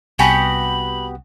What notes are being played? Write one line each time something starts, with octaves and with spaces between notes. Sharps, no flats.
C2 B3 F#4 G4 G#5 A5 B5